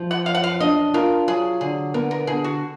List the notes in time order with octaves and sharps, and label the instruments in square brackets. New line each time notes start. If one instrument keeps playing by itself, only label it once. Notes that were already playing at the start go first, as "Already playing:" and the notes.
Already playing: [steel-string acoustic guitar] F3
[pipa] F#5
[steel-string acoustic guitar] F#2 [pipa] F5
[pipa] F#5
F5
[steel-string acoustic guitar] D4 [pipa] D#5
[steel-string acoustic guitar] F4 [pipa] A#4
[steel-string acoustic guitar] F#3 [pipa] G#4
[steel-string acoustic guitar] D3 [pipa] G#4
[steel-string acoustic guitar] B3 [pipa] A#4
[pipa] A#4
[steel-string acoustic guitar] D3 [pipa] G#4
[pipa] F#4